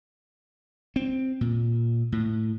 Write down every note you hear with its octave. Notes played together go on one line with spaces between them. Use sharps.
C4
A#2
A2